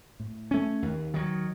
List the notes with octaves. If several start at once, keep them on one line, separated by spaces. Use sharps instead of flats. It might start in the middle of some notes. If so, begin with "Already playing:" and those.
A2
A3 C#4
D#2
D#3 F#3